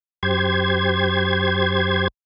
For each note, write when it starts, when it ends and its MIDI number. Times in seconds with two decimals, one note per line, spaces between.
0.23 2.08 42
0.23 2.08 67
0.23 2.08 72
0.23 2.08 92